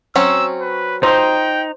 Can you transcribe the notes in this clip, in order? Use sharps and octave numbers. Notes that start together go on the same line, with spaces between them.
F#3 C4 C#4 E6
B4
D#4 C5 G5